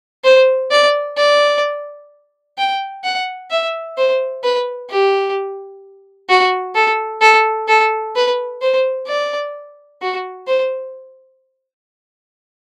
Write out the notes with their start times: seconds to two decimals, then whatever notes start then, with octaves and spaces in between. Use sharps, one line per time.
0.24 C5
0.71 D5
1.18 D5
2.58 G5
3.04 F#5
3.50 E5
3.97 C5
4.43 B4
4.90 G4
6.29 F#4
6.75 A4
7.21 A4
7.68 A4
8.15 B4
8.62 C5
9.07 D5
10.02 F#4
10.47 C5